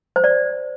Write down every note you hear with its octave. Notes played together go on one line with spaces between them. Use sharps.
C5
D5